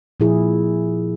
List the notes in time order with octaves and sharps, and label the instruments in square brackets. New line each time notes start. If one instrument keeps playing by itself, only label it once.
[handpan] A#2 F3 E4 G#4